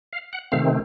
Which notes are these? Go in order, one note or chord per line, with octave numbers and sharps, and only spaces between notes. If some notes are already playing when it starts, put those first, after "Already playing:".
F5
F#5
C3 D#3 A3 C4 F5